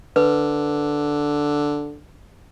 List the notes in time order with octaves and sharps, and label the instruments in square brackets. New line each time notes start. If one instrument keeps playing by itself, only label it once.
[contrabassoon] D3 [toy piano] B4